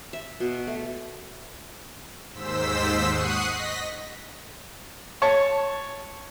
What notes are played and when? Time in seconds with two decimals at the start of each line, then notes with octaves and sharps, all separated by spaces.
0.13 E5
0.40 B2
0.67 A3
2.33 D#2 G#2 C5 E6 B6
3.09 F#5 C#6 D#6 F#6 C7 D#7
3.47 D#5 A#6 B6
5.22 C#5 A5 C#6